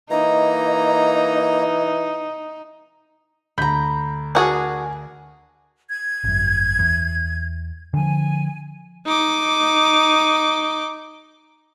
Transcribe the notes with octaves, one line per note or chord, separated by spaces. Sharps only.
E3 A#3 D#4 D#5 A#5
D2 A#5 B5 G6
D4 F#4 G#4 A#4 G#5
G#6
G#1 F#2
E2
D3 F3 G#5
D#4 D6